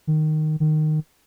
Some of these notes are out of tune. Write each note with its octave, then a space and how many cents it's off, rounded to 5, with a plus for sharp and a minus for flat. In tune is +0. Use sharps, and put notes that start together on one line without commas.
D#3 -10
D#3 -15